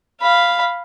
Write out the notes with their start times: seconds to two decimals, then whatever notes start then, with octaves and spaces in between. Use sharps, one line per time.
0.22 F5 B5